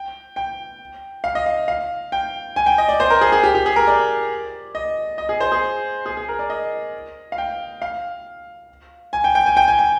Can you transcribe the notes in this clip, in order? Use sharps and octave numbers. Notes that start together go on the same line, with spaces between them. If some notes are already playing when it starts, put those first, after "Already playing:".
Already playing: G5
G5
F5
D#5
F5
F5
G5
G#5
G5
D#5
D5
C5
A#4
G#4
G#4
G4
G4
G#4
A#4
D5
D#5
D#5
G#4
C5
G#4
G#4
G#4
A#4
D5
D#5
F5
G5
F5
G#5
G5
G5
G#5
G5
G#5
G5